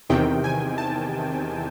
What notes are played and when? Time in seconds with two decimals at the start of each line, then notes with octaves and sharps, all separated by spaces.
0.10 E2 C3 D#3 G5
0.44 G#5
0.78 A5